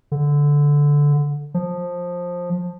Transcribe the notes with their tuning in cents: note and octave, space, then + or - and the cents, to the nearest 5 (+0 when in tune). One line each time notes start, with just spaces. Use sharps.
D3 -10
F3 +15